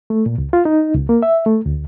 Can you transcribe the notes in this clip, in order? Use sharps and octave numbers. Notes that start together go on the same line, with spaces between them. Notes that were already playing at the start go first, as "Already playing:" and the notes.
A3
A#2
C#2
F4
D#4
C#2
A#3
E5
A3
D2